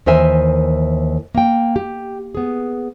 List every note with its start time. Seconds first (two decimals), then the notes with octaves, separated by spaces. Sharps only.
0.06 D#2 E3 A#4 C5 E5 G#5
1.35 A#3 G5
1.76 G4
2.35 B3 G#4